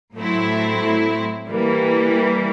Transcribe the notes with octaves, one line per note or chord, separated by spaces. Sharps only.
A2 F#3 A3 C4 E4
E3 G3 A#3